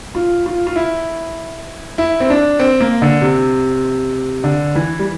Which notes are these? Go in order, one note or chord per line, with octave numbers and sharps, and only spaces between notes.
F4
F4
F4
E4
E4
C4
D4
C4
A#3
D3
C3
D3
E3
G3